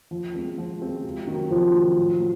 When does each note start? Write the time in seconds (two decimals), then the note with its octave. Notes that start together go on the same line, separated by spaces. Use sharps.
0.11 F3
0.34 G#3 C4 F4
0.58 F3
0.81 G#3 C4 F4
1.04 C3
1.27 D#3 F#3
1.51 C3 F3
1.74 D#3 F#3
1.98 A2
2.20 F#3